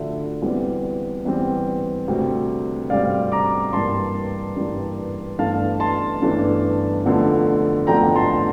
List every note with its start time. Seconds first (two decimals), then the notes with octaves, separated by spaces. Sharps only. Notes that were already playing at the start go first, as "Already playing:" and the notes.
Already playing: D2 D3 F3 E5
0.42 E2 E3 G3 C4
1.25 E2 E3 G3 C4
2.08 D2 C3 G3 C4
2.90 D2 C3 G3 C4 D5 F5
3.32 A#5 D6
3.73 G2 E3 G3 A#3 A5 C6
4.56 G2 E3 G3 A#3
5.39 G1 G2 E3 A3 D4 F5 A5
5.80 A5 C6
6.22 G1 G2 E3 A3 D4
7.05 F1 E2 D3 F3 A3
7.87 F1 E2 D3 F3 A3 G5 A#5
8.16 A5 C6